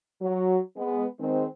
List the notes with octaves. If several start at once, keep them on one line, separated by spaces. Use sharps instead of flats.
F#3
G#3 B3
D#3 G#3 C4